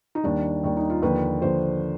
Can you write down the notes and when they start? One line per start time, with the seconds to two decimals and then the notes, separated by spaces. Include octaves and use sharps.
0.15 D#4
0.23 D#2 D#3 G3 D4
0.64 D#2 D#3 G3
0.77 D#4
0.90 F4
1.02 D#2 D3 F3 B4
1.42 D#2 D3 F3 C5